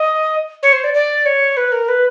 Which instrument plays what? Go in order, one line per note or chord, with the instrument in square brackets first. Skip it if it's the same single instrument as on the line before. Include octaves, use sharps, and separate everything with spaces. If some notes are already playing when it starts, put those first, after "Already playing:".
Already playing: [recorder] D#5
C#5
C5
D5
D5
C#5
B4
A#4
B4